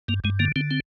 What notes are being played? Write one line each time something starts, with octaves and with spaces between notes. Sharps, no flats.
G2 A#3
G2 G#3
D3 A#3
D3 C4
C4